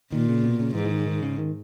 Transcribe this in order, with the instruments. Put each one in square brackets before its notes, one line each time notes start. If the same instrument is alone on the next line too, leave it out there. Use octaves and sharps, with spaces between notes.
[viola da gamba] A#2 [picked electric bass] D#3
[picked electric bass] C#3
B2
C#3
[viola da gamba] G#2 [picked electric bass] E3
[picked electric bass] E3
D#3
D#3
C#3
D#3